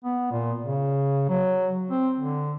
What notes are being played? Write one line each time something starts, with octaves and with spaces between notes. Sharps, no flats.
B3
A#2
C#3
F#3
C4
D3